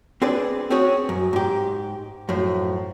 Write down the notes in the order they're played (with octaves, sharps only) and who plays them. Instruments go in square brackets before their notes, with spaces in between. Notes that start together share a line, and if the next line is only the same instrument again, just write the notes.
[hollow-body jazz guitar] C4 D4 G#4 B4 D5
C4 C#4 F#4 G#4
F#2
G#2 G4
F#2 A2 F3